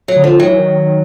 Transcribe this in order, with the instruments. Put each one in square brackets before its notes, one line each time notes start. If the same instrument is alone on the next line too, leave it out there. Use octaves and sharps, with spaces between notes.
[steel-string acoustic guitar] F#3
[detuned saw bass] D3
[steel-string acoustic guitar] F3
[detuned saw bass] D#3 [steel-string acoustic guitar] F#3
[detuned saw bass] E3
D#3